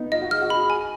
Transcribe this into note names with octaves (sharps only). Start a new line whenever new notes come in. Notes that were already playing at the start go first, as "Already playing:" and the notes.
Already playing: B3 D#4
F4 D#5
F#4
G#4 F6
F#4
G#4 B5
G#5